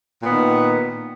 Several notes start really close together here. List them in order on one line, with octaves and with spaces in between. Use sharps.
A#2 B3 D#3